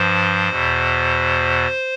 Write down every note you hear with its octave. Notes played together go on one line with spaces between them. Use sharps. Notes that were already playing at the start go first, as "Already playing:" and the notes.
Already playing: G2 F3 C5
E2 B2